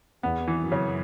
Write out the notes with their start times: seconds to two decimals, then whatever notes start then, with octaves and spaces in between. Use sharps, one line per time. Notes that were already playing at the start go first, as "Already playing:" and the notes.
0.23 E2 B3
0.48 E3
0.60 F#2
0.72 C#3